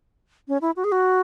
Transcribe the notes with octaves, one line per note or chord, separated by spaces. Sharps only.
C#4
E4
F#4
G#4
F#4